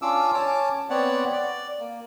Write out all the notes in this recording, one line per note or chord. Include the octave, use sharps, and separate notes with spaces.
C#4 D4 F4 D6 E6
C#4 C#5 A5 D6
B3 C4 C#5 D5 F#5
D5
A#3